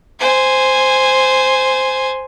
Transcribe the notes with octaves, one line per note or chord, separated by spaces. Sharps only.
C5 G#5